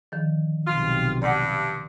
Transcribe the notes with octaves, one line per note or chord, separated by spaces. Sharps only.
D3 D#3 F3
B1 C3 F4
G2 D5 F#5